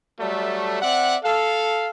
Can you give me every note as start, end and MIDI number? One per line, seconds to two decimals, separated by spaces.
0.19 0.80 54
0.19 0.80 55
0.19 0.80 57
0.82 1.16 60
0.82 1.16 74
0.82 1.16 76
0.82 1.16 78
1.24 1.90 69
1.24 1.90 77